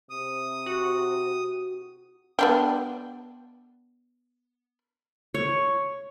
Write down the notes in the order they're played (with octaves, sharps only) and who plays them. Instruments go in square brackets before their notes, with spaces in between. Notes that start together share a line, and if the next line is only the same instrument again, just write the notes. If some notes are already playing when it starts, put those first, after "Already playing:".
[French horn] C3 [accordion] D#6
[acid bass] F#4
[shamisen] B3 D4 G4
[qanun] C#5